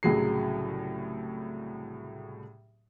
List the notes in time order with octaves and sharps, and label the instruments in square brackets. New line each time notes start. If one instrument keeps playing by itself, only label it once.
[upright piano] C2 A2 C#3 F#3 G#4 C7